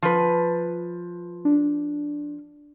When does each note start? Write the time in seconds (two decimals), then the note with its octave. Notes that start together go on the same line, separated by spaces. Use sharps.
0.03 F3 B4
1.45 D4